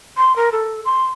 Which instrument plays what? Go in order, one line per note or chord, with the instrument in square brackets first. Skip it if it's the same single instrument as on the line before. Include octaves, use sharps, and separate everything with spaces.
[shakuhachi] C6
A#4
A4
C6